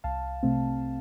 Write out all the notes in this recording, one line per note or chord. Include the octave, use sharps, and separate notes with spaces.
C2 F5 A5
C3 A3 C4